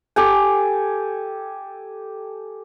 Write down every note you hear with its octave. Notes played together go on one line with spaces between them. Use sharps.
G4 A4 G5 G#5